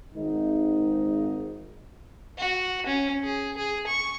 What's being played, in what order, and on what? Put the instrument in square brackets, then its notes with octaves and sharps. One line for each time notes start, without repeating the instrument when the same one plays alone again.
[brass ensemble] G#1 D#4
[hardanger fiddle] F#4
C#4
G#4
G#4
C#6